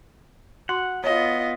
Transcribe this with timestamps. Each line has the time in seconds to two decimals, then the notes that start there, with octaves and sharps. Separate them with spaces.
0.69 F#4 F#5 C6
1.04 B3 F4 C#5 D#5